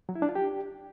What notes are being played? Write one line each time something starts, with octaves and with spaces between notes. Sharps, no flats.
F#3
E4
D4
F4
G4